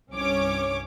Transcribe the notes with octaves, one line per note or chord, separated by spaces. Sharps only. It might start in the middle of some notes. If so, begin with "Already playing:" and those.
C2 G2 C#4 C#5 D6